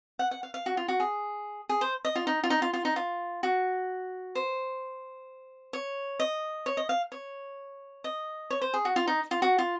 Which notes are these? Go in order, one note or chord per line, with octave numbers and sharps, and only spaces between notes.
F#5
F#5
F5
F5
F#4
F4
F#4
G#4
G#4
C5
D#5
F4
D#4
F4
D#4
F4
F4
D#4
F4
F#4
C5
C#5
D#5
C#5
D#5
F5
C#5
D#5
C#5
C5
G#4
F#4
F4
D#4
F4
F#4
F4